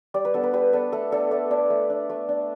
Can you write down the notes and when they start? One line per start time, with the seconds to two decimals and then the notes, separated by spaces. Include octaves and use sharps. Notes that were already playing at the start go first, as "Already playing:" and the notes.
0.14 G3 D5
0.25 B4
0.34 B3 D4 A4
0.43 B4
0.54 G3 B4
0.73 B3 D4 A4
0.92 A3 A4
1.12 D4 A4
1.31 A3 D5
1.51 D4 D5
1.70 A3
1.90 D4
2.09 A3
2.29 D4